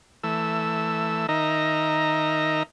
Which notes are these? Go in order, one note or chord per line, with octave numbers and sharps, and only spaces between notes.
E3 A3 E6
D#3 D#4 A#4 E5 A#5